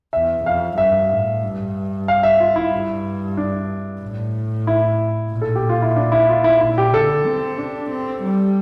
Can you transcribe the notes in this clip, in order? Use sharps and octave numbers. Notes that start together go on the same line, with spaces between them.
E2 E5
F2 F5
G2 E5
A2
G2
F5
E5
F4
E4
G2
D4
A2
E4
A#2
A4
G4
F4
E4
D4
E4
F4
E4
A#2 E4
G4
D3 A4
C4
D4
C4
G3